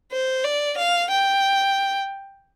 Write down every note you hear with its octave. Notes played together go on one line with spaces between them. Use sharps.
C5
D5
F5
G5